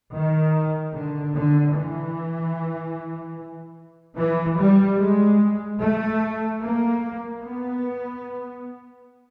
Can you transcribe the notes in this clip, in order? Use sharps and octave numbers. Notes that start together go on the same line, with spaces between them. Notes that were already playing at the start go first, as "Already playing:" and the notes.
D#3
D3
D3
E3
E3
G3
G#3
A3
A#3
B3